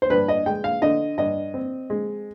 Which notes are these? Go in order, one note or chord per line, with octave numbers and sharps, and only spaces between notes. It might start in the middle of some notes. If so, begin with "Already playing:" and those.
C5
G2 B4
D#5
G#3 G5
F5
D3 D#5
G2 D#5
C4
G#3